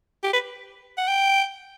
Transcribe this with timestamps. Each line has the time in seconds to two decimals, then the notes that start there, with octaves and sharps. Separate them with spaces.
0.24 G4
0.33 B4
0.97 F#5
1.08 G5